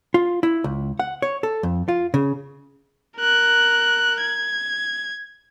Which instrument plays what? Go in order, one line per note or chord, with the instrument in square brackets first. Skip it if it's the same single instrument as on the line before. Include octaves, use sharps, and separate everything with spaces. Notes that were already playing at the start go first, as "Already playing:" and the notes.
[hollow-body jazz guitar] F4
E4
C#2
F#5
C#5
A4
F2
F4
C#3
[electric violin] A#4 F#6
G#6